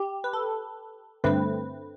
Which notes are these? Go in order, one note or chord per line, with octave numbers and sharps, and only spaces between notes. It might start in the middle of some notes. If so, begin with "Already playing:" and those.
Already playing: G4
B4
A4
G2 D3 A3 C4 B4